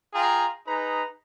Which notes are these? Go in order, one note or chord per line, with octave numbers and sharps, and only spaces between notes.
F4 G#4 G5 A#5
D#4 G#4 B4 A#5